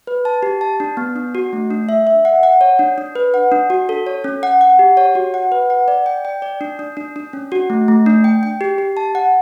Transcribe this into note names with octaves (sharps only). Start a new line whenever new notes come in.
B4
A5
G4
A5
D4
B3
D4
F#4
A3
D4
E5
E5
F#5
F#5
C#5
D4
D4
B4
F#5
D4
F#4
A4
C#5
C#4
F#5
F#5
G4
C#5
F#4
F#5
B4
F#5
D5
G5
G5
D5
D4
D4
D4
D4
C#4
F#4
A3
A3
D4
G5
G5
G4
G4
A5
F#5